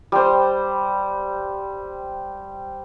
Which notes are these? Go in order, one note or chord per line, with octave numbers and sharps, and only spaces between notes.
G3 C5